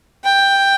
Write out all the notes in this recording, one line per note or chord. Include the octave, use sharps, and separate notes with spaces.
G5